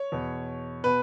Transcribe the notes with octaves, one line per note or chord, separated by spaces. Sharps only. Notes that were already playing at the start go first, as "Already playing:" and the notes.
Already playing: C#5
E2 B2
B2 B4